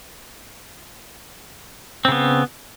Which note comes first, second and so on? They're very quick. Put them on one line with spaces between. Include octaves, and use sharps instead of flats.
C4 C#3 B3